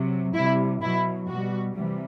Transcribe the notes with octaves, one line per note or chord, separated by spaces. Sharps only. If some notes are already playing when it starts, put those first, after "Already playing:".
Already playing: C3 F#3
C3 G3 E4
B2 F#3 E4
B2 G3 F#4
C3 E3 G3